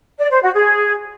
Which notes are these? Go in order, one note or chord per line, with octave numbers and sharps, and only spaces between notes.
D5
C5
F#4
G#4